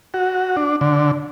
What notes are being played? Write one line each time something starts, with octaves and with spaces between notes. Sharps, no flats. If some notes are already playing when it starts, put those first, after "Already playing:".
F#4
D4
D3